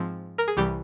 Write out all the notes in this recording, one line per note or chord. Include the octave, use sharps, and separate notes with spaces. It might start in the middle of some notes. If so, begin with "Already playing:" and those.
Already playing: G#2 F3 C4
A#4
G#4
C2 C3 E3 G3 G4